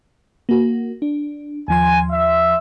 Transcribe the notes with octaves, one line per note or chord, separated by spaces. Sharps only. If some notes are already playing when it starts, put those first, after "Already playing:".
A#3 F#4
D4
D#2 F3 G#5 C6
E5